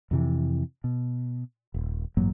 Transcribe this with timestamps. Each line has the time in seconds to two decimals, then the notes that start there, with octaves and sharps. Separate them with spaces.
0.11 F2 C3 E3
0.84 B2
1.74 D#1
2.17 A1 G2 F#3 A#3